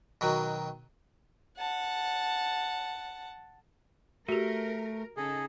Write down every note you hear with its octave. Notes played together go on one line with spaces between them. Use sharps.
B2 D#3 F#3
F#5 A5
A3 F#4 G4 A#4
C#3 D#4 G#4 A4